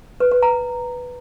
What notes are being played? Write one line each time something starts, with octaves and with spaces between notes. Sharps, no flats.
B4
B4
A#5